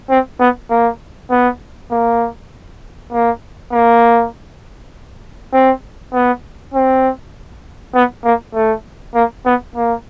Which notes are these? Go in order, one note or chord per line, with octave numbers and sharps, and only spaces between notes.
C4
B3
A#3
B3
A#3
A#3
A#3
C4
B3
C4
B3
A#3
A3
A#3
B3
A#3